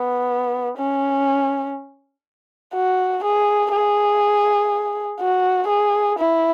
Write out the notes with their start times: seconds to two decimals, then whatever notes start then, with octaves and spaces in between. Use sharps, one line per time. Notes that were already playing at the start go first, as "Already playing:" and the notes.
Already playing: B3
0.78 C#4
2.74 F#4
3.23 G#4
3.72 G#4
5.20 F#4
5.69 G#4
6.18 E4